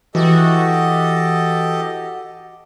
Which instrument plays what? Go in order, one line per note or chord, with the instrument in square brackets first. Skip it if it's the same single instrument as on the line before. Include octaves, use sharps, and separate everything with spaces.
[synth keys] E3 [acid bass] F#4 [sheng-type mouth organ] G4 A4 D#5